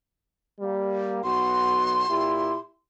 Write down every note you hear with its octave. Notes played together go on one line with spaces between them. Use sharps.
G3 A#3
B1 B3 F#4 C6
A#2 E4 G4